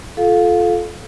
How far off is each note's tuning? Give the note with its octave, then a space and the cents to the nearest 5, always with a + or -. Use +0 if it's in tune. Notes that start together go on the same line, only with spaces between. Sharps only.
F4 +0 A4 -20 F5 +20